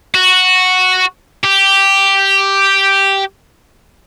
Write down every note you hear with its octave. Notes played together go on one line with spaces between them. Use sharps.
F#4
G4